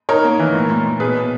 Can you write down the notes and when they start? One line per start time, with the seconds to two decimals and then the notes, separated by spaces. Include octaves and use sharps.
0.09 D#4 A#4 C#5
0.24 A#3
0.39 E3
0.54 A#2
0.70 A#2
0.85 A#2
1.00 B2 G#4 B4
1.15 B2